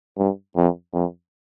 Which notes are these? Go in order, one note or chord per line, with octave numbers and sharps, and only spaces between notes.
G2
F2
F2